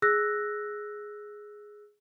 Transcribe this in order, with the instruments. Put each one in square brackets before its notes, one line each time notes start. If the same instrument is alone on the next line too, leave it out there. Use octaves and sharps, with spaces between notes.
[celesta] G#4 E6 F#6 A#6